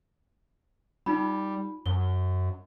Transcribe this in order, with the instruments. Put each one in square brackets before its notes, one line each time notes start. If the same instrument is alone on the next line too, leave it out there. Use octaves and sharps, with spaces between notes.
[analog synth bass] G3 [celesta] D#4 F4 B5
[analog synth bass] F#2 [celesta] G7